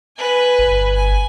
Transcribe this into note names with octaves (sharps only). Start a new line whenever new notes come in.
B4 G#5
G1
G#5